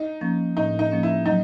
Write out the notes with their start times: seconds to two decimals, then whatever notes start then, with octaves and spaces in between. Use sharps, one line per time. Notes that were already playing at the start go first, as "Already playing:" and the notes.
Already playing: D#4
0.21 F3 A#3 C#4
0.57 A2 D#4
0.79 D#4
0.91 F3 A#3 C#4
1.03 E4
1.26 F#3 D#4